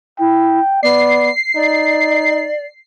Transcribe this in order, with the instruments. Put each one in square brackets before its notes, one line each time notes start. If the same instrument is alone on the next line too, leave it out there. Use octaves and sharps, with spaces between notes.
[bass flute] E4 [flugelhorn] G5
[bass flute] B3 [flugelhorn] D5 [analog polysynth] C7
[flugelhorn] D#4 [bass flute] D5